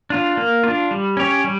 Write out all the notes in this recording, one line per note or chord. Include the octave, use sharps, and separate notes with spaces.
D4 F4
A#3
D4 F4
G3
C#4 G4 C#5
G3